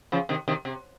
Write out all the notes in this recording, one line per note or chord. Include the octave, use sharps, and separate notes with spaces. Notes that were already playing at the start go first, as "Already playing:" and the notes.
C#3 F3
C3 D#3
C3 D#3
C3